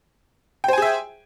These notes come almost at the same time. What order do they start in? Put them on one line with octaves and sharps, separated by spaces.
G5 C5 G#5 G#4 E5